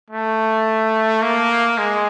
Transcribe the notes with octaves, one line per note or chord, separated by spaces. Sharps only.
A3
A#3
G#3